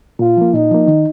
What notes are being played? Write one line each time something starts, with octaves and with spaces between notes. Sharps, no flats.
A#2 F4
F3 A#3
A#2 D#4
F3 A#3
D#3